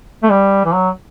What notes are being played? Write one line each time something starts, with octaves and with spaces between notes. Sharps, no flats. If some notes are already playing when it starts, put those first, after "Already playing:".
A3
G3
E3
F#3